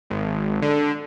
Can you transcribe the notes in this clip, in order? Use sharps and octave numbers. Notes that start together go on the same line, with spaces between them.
G#1
D3